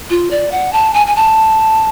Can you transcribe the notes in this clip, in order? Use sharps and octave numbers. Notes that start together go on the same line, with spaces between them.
F4
D5
F#5
A5
G#5
G#5
A5